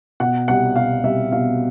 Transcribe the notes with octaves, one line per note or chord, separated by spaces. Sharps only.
B2 F#5
C2 F#5
B2 F5
C2 E5
B2 F5